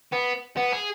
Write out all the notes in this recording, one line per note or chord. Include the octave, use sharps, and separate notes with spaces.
B3
B3
G#4